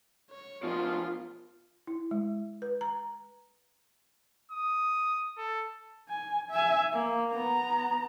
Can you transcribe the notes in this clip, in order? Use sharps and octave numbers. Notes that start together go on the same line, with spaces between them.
C#5
B2 F3 F4
E4
G#3
B4
A#5
D#6
A4
G#5
E5 G#5
A#3
B3 A#5